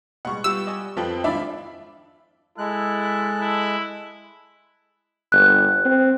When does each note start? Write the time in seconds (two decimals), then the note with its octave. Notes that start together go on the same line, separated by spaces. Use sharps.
0.25 B2 G3 G#3 F#5 C#6
0.44 G3 B3 F4 G4 E6
0.66 D5 D#5 G#5
0.97 F2 F3 C4 F4 A4 B4 G5 F#7
1.24 G#1 G#2 D4 E4 F4 D5 E5 B5
2.58 G#3 E4 A4 F#6
3.41 E4
5.32 G1 F#6
5.85 C4